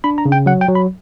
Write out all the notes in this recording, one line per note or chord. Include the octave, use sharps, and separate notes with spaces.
D4 B5
A#5
C#3
G5
F#3 F#5
G5
F#3
B5